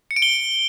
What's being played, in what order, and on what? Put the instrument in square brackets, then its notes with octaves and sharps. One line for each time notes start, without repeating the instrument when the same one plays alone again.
[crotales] C#7
D7
G7